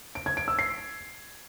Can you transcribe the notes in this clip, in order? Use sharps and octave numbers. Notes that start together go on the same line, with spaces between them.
D7
G#6
D7
E6
C7